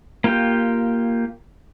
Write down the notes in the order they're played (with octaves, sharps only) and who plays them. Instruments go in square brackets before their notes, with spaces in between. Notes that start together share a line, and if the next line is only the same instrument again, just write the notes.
[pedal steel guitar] A#3 F4 G4 G5